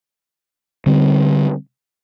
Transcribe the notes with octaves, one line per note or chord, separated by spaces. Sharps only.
D3 G3 C4